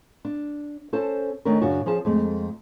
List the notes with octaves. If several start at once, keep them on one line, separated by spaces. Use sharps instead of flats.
D4
C#4 A4 C5 A5
D#3 A3 C#4 D4 A#4
F#2 C#3 D4 F#4
F3 C#4 G#4 A5
F2 G#3 A3